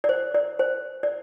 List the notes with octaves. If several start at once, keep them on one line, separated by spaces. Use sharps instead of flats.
D5
C5
D5
C5
D5